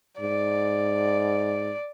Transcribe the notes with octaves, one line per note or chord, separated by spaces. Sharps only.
G#2 D5